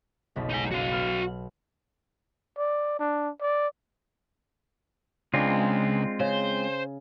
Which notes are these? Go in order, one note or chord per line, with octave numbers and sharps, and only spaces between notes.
F#1 B1 B6
D#4 G#5
F#4 F5
B3 F6 E7
D5
D4
D5
C#2 G#3 C4 D4 F4
C#3 C5